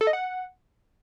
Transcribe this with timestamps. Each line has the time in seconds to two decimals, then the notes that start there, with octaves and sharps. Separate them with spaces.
0.01 A4
0.07 D#5
0.13 F#5